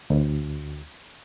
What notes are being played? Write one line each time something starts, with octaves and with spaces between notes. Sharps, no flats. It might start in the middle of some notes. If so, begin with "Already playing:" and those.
D2